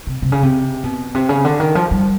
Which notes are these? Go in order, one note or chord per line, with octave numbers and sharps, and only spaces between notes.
C3
C3
C#3
C3
B2
C3
C#3
D3
D#3
F3
G3